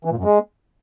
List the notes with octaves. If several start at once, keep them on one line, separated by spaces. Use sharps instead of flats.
E3
A#2
F#2
G#3